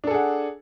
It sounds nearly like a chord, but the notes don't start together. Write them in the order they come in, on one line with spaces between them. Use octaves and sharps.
D4 A4 G#4 F#5